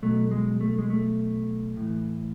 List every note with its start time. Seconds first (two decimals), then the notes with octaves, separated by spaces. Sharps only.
0.02 B2 F#3 A3
0.31 G#3
0.61 A3
0.78 G#3
0.90 A3
1.77 A2 E3